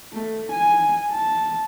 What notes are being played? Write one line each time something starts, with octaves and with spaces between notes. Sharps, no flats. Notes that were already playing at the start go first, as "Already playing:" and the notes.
A3
G#5
A5